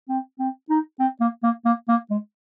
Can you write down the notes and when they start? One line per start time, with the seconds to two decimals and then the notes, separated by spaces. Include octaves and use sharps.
0.09 C4
0.39 C4
0.70 D#4
0.99 C4
1.20 A#3
1.43 A#3
1.65 A#3
1.88 A#3
2.10 G#3